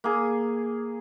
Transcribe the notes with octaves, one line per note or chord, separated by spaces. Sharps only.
A#3 G#4